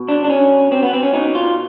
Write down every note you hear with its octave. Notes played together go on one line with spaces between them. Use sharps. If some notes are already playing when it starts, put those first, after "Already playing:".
Already playing: B2
D4
D4
C#4
C4
B3
C4
C#4
B2 D#4
F4